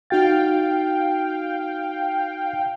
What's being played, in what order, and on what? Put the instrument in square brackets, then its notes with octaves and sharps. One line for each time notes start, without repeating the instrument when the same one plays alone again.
[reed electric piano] D#4 F#4 A6 [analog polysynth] F5 G5